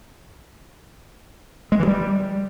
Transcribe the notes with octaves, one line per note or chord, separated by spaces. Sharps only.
G#3
E3
G3